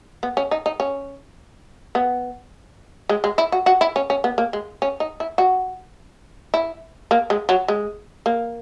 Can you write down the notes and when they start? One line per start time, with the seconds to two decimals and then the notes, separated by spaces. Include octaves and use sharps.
0.23 B3
0.37 C#4
0.51 D#4
0.66 D#4
0.80 C#4
1.95 B3
3.09 G#3
3.24 G#3
3.38 E4
3.52 F#4
3.66 F#4
3.81 E4
3.96 C#4
4.10 C#4
4.24 B3
4.38 A#3
4.53 G#3
4.82 C#4
5.00 D#4
5.20 E4
5.38 F#4
6.54 E4
7.11 A#3
7.30 G#3
7.49 F#3
7.68 G#3
8.26 A#3